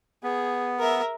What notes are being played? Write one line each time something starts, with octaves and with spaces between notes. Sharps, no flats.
B3 G#4
A#4 E5